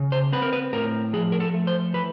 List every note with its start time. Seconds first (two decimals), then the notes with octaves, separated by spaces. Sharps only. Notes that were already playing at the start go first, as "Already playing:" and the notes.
Already playing: C#3
0.12 C5
0.33 C4 B4
0.42 A#4
0.53 B4
0.73 A2 A#4
1.13 F3 G#4
1.32 A#4
1.40 A4
1.54 A3
1.67 C5
1.94 E3 B4